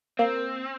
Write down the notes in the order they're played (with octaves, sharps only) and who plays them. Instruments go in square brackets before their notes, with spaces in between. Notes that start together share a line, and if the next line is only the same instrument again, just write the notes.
[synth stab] A#3 [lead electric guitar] C4